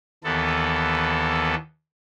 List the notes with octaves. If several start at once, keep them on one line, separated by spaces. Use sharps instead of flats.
D#2 E3 B3 A4